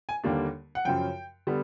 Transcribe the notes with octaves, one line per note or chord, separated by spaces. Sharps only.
G#5
D#2 D3 G3 A#3 D4
F#5
F#2 C#3 F3 G5
D3 G3 B3